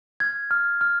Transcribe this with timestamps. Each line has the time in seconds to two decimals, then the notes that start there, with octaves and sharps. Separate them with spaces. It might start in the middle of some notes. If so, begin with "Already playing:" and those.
0.20 F6 G#6
0.51 F6
0.81 F6